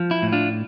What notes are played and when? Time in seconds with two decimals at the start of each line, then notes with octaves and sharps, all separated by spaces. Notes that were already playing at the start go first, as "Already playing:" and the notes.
Already playing: F3
0.11 E4
0.22 A2
0.32 D4 F4